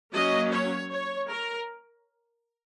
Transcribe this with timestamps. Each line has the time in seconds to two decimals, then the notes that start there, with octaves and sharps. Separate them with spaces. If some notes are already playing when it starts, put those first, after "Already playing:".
0.13 F#3 A#3 C#4 D#5
0.51 C#5
0.91 C#5
1.30 A#4